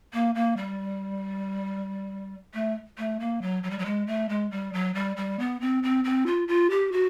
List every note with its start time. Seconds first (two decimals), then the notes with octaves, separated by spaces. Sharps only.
0.13 A#3
0.35 A#3
0.57 G3
2.54 A3
2.98 A3
3.20 A#3
3.42 F#3
3.63 F#3
3.71 G3
3.79 F#3
3.85 G#3
4.07 A3
4.29 G#3
4.51 G3
4.73 F#3
4.95 G3
5.17 G3
5.39 B3
5.61 C4
5.83 C4
6.04 C4
6.26 F4
6.48 F4
6.70 G4
6.92 F#4